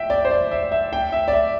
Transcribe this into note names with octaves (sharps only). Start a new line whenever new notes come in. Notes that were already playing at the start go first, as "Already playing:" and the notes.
Already playing: E5 G5
D5
C5
D5
E5
E5
G5
E5
D5
E5